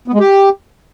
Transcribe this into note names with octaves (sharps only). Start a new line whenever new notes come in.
B3
G#3
G4